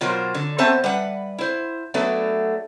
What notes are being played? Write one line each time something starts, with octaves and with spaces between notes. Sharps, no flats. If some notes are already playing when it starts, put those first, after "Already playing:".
B2 F#3 F4 A#4 C5
D3
B3 C4 C5 C#5 E5 A5
G3 B4 F#5
E4 C5
F#3 A3 B3 D4 B4